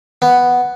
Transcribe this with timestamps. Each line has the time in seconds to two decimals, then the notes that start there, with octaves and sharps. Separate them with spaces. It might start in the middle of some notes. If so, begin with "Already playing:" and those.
0.22 B3